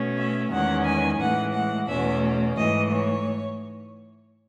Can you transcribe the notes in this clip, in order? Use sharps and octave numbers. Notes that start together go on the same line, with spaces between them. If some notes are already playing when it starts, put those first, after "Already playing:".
Already playing: B2 A3 C#4
E5
E2 D#3 G#3 C#4 F#5
G#5
A2 E3 G#3 F#5
F#5
E2 B2 A3 C#4 E5
G#2 E3 A3 D#5
C#5